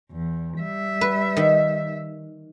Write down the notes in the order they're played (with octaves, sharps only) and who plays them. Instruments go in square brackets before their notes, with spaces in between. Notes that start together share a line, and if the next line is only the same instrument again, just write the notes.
[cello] E2
G3 E5
[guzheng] B4
D#3